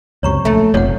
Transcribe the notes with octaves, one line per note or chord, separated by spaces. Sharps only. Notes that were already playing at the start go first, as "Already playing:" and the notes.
C#2 F#2 C3 C#5 A#5 C#6
A#1 A3 E5 A5 A#5
F1 B1 F2 C#5 F#5